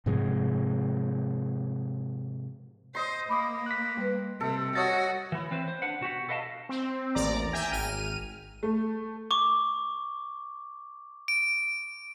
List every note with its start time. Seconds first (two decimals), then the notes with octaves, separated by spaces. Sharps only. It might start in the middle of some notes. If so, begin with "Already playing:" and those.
0.06 G#2 C3 F3 G#3
2.95 C5 D#5 C6
3.29 A#3 B5 D6 D#6
3.66 F#6 B6
3.98 G3 B4
4.40 C3 A4
4.75 F#4 C#5 D#5 A6
5.32 E3 E4
5.51 C4 B4 C5
5.68 C5
5.82 D4 B4 F#5
6.01 B2 F#4 G4 F#5
6.29 A4 B4 D#5 F5 F#5 A5
6.69 C4
7.15 A1 D#2 D5 A#5 D6
7.52 E5 G5 G#5 A#5
7.72 G#1 F6 D#7
8.63 A3
9.31 C#6 D6
11.28 D7